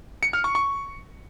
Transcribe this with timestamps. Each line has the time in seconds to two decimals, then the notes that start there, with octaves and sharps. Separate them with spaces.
0.23 C#7
0.33 F6
0.44 C#6
0.55 C#6